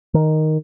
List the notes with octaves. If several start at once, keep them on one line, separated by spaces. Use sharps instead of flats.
D#3